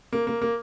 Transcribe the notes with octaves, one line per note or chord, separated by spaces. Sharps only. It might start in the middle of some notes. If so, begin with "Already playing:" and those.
A#3
A#3
A#3